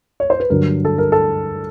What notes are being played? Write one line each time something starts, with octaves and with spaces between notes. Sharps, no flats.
C#5
C5
B4
G2 D3 F#3 A#4
A4
A#4
A4